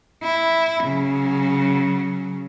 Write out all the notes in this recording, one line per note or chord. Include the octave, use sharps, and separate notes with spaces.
E4
C#3 F#3